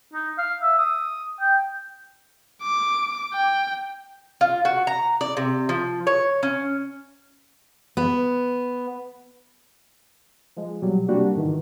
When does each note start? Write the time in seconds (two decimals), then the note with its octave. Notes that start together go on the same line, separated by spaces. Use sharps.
0.13 D#4
0.38 F5
0.62 E5
0.78 D#6
1.41 G5
2.63 D6
3.34 G5
4.41 F4
4.65 F#4
4.87 A#5
5.21 D5
5.37 C3
5.69 F3
6.07 C#5
6.43 C#4
7.97 B3
10.57 F3 G#3
10.82 B2 F#3 G3
11.08 C3 G3 A#3 D4 F#4 G4
11.35 G#2 D#3 E3